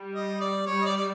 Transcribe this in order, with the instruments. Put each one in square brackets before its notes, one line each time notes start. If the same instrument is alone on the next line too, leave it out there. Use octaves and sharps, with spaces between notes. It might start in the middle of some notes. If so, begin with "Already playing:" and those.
Already playing: [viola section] G3
[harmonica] D#5
D5
[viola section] G3 [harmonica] C#5
[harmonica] D#5
D5
D5